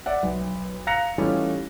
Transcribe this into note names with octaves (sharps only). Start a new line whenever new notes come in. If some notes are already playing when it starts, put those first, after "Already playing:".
D5 E5 F#5
B1
F5 A#5 F#6 A#6 C#7 F7
E3 G3 A3 C#4 D#4 F4